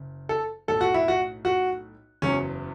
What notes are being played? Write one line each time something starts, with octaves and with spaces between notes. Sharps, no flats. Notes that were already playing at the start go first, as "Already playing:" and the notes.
Already playing: F#1 C#3
A4
B1 A2 A3 A4
F#4
E4
F#4
F#4
F#1 E2 C#3 F#3 B3 C#4